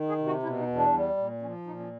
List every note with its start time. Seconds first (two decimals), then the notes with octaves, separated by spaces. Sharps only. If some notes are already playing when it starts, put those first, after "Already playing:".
Already playing: D#3
0.08 G#4
0.18 C3
0.26 F#4
0.43 B2 E4
0.59 D#4
0.67 E2
0.75 D4
0.92 G3
1.17 A#2
1.41 F3 C#4
1.67 A#2 D#4
1.79 C#4